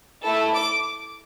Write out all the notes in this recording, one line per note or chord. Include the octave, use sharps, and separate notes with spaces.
A3 E4 A4
D6